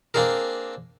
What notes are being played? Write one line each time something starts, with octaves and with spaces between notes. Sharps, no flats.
A#3 C4 D4 G#4 A#4